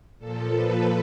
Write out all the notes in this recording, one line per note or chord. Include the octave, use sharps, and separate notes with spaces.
A#2 A4
F3
B4